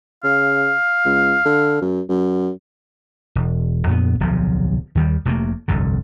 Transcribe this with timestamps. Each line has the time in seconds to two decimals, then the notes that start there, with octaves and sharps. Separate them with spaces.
0.24 C#3 F5
1.06 C#2
1.46 D3
1.82 F#2
2.09 F#2
3.35 E1
3.87 F2 A#2 B3
4.20 D1 B1 C3 F3
4.95 D#2 D#3 G3
5.25 F1 C3 A3 A#3
5.68 F1 C2 G2 D3